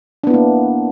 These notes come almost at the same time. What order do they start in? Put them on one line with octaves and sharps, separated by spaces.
D4 B3 E4 A#3